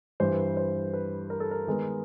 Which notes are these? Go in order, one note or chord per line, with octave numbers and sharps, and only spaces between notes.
G2 E3 G3 C5
C5
B4
A#4
A4
A#4
D#3 G#3 B3